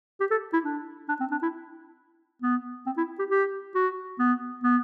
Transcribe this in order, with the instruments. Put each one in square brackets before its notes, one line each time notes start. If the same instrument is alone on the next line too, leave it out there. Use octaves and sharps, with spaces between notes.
[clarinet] G4
A4
E4
D4
D4
C4
D4
E4
B3
C4
E4
G4
G4
F#4
B3
B3